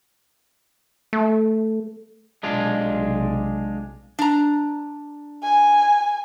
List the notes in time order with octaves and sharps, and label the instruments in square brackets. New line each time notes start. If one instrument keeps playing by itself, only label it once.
[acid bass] A3
[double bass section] B1 C3 [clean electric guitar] G#3 D4 F4
[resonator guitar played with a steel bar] D4 A#5
[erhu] G#5